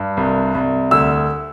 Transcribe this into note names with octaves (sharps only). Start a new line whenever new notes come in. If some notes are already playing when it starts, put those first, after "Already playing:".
Already playing: G2
C2
C2
D2 E6